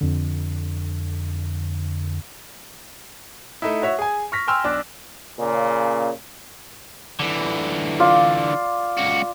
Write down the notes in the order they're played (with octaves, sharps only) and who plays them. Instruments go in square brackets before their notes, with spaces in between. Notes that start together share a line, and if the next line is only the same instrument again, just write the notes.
[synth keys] F2 D3
[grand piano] A3 D#4 E4
F#4 C#5 E5
G#4 G#5
C#6 F6 A#6 B6
G5 G#5 C6 E6 F6
B1 D4 D6 F#6
[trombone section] A#2 C#3
[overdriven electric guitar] D3 E3
[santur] F4 D5
[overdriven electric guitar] C#2 F#4